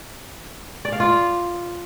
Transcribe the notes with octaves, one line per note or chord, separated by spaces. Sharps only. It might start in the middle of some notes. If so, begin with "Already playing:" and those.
D5
F5
F4